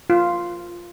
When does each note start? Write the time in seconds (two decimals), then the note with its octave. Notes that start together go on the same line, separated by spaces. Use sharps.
0.10 F4